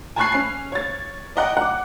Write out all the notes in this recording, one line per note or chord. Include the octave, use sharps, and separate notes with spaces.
G#5 A5 B5 C#6 F#6 C7
C#4 C7
C#5 A6
D5 D#5 F#5 G5
F#5 D6